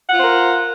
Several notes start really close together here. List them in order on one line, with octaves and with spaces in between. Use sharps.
F#5 F4 C5 A#4